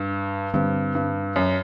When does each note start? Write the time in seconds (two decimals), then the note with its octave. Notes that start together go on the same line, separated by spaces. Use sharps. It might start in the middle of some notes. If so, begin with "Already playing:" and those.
Already playing: G2
0.54 G2 D3 G3 C4
0.95 G2
1.36 F#2